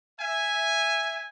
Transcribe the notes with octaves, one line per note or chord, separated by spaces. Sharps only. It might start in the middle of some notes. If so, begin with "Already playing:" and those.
E5 G#5